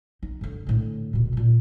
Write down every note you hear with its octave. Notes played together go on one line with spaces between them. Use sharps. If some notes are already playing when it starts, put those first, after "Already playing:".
D#4
F#2 D3
A2 D3
D#1 B2
A#2 D#3